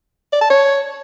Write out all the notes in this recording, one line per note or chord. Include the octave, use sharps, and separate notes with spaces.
D5
A5
C#5